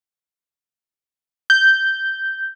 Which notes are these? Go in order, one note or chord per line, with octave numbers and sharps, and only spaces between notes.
G6